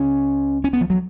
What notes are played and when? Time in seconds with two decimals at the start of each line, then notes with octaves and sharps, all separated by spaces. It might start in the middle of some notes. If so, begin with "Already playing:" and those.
Already playing: C#2 C#3 C#4
0.64 C#4
0.73 B3
0.81 F3
0.90 F#3